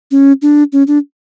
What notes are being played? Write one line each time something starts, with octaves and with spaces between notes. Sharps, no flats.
C#4
D4
C#4
D4